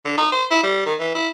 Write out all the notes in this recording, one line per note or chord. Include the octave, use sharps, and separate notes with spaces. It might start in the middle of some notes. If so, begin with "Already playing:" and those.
D3
D#4
C5
E4
G3
D#3
E3
E4